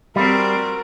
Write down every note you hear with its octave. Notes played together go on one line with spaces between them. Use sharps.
G3 C4 F#4 A#4